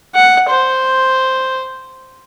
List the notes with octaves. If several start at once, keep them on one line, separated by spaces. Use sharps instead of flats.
F#5
C5